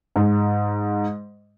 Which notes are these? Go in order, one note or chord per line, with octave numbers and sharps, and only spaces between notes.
G#2